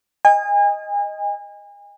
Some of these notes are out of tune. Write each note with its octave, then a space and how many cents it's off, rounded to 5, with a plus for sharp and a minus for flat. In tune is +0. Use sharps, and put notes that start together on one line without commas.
D#5 +0 G#5 -35